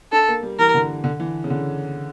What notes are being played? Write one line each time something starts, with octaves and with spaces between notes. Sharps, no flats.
D4 A4
A#3
G3
E3 A#4
D3
D3
E3
C#3
D3